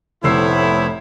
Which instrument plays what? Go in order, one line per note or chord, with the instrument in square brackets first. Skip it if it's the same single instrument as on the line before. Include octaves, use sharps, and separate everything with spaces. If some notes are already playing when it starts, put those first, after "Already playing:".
[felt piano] F1 E6 C7 [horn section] A2 E4 [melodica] B3 C5 C#5